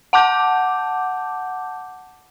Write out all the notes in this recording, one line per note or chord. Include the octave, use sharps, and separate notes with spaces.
F#5 A5 D6 G6